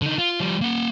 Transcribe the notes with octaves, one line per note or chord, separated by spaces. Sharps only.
D3 D#4
F4
F3 G3
A#3 F#5